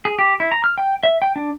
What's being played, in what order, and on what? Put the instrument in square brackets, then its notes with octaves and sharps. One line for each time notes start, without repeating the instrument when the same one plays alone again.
[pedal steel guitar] G#4
G4
E4
A#5
F6
G5
E5
G5
D4